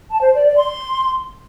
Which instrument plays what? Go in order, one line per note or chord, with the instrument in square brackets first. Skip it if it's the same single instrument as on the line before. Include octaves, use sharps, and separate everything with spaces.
[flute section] A5
C5
D5
D5
C6